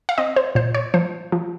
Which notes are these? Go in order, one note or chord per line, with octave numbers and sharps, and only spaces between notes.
F5
C4 D#5
C5
A#2 C5
C#5
F3 C5
F3